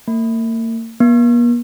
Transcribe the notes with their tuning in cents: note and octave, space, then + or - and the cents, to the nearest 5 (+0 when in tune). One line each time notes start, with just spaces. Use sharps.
A#3 -40
A#3 +45